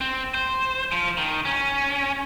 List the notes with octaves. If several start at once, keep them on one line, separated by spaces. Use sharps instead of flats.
C4
C5
F3
D#3
C#4